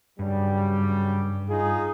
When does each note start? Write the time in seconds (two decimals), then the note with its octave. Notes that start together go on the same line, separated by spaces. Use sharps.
0.19 G2 C#3 F#3 G3
1.49 D#4 F4 G#4